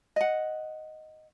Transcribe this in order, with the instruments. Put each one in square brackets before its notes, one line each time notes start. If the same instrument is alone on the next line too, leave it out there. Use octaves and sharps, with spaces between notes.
[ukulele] D#5 F#5